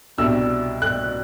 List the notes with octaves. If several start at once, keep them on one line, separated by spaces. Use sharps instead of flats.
C2 B2 G3 D4 E6
F#6